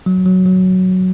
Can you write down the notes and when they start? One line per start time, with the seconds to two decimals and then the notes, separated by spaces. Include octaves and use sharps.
0.06 F#3
0.26 F#3
0.46 F#3